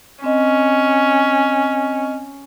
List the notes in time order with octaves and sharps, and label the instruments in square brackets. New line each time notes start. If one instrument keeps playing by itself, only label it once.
[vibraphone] C4 D#5 [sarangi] C#4